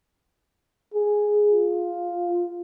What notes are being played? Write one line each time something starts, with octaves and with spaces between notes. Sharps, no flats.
G#4
F4